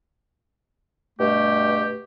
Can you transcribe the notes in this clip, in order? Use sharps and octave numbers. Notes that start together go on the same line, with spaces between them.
G2 B2 A3 G4